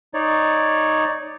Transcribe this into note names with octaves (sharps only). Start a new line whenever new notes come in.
D#4 C#5 D5